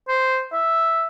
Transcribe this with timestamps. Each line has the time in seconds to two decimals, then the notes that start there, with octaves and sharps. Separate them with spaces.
0.08 C5
0.52 E5